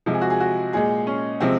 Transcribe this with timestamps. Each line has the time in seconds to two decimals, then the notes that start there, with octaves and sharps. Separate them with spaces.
0.06 C3 F3 G#3
0.14 G#4
0.22 F#4
0.30 G#4
0.40 F#4
0.73 A#2 G#3 G#4
1.07 C#4
1.40 C3 F3 G#3 C4